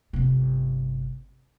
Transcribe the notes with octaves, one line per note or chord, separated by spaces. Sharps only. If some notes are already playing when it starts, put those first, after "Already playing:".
G1 C3